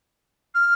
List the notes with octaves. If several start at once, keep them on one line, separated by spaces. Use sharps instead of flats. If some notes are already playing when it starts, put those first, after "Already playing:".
F6